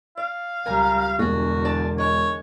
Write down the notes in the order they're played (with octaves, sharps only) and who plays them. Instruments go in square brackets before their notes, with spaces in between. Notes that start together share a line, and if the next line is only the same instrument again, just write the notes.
[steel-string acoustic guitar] D5 [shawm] F5
[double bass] C#2 G3 [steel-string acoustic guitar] A#4 G#5 A#5
[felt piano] E1 [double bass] E2 D3 [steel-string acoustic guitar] F4 G#4 [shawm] F#4
[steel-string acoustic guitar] G#4 D5 A5
[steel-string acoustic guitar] D#3 G#3 [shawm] C#5